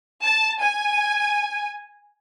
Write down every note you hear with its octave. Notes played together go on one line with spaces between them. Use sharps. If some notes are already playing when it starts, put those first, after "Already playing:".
A5
G#5